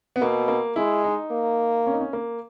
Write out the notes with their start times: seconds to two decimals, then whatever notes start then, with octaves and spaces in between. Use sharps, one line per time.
0.16 B3
0.22 B2 A#3
0.48 A#3
0.76 G#3 E4
1.04 D#4
1.31 A#3
1.87 C#4
1.93 D#4
2.00 C#4
2.13 A#3